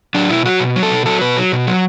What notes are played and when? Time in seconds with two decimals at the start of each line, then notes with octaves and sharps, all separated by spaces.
0.15 F#3 D4
0.30 B2 E4
0.45 F#3 F#4
0.60 B2
0.76 F#3
0.83 A4
0.91 B2
1.06 F#3 A4
1.21 B2 B4
1.37 F#3
1.52 B2
1.67 F#3